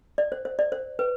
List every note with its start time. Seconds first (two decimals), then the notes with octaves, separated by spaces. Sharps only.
0.18 D5
0.32 C5
0.45 C5
0.59 D5
0.72 C5
0.99 B4